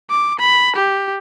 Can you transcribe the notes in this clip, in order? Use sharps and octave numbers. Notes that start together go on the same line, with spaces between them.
D6
B5
G4